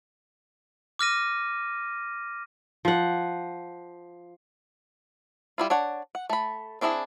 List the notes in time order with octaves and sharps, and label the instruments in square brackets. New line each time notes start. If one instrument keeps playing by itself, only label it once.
[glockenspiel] D6 F6 A#6 D#7
[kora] F3 F#5
[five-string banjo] G3 E4 F4
D4 C#5 F#5
F#5
A3 B5
C4 D4 E4 F#4 G#4